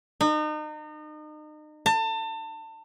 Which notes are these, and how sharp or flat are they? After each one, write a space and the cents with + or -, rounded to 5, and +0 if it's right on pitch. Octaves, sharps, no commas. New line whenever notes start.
D#4 -35
A5 +30